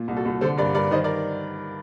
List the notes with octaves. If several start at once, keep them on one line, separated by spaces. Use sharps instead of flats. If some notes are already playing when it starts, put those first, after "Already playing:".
Already playing: A#2
C2
F#4 A4
C2
D3 A4 C5
G2 A#4 D5
G2 A#4 D5
D#3 C5 D#5
A#4 D5